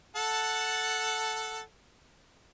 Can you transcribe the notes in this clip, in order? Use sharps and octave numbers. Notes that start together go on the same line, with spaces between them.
A4 F#5 A5